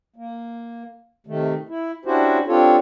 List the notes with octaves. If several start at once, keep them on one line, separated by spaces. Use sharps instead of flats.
A#3
C3 D#3 A3
E4
C#4 D4 E4 F#4 G4 C5
C4 D4 F4 G4 A4 C#5